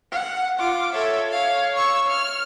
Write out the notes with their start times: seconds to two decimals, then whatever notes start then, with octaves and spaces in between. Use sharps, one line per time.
0.12 F#5
0.59 F4 D6
0.93 A4 C#5 E5
1.31 F5
1.76 C#6 E6
2.07 F6